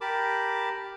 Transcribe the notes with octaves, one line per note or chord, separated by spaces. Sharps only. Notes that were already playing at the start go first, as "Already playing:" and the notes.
G4 A#4 A5 B5 D6